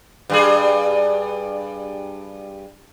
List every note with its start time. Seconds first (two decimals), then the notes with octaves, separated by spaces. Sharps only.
0.30 G2 G3 G#4